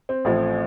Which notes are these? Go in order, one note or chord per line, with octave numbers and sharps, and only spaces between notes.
C4
A1 A2 F3